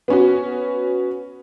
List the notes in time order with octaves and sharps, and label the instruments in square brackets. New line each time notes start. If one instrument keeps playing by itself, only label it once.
[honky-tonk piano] B3 C#4 F#4